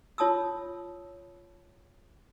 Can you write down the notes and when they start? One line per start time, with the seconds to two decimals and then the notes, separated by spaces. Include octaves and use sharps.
0.18 F4 C#5 A5 D#6 E6